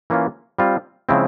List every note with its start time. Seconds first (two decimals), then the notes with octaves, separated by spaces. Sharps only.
0.10 E3 A#3 C#4 F4
0.59 G3 C4 F4
1.09 C#3 F3 G#3 C4 E4